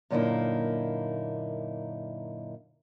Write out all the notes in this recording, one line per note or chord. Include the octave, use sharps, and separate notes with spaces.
F#2 A#2 D3 A#3 D#4 E4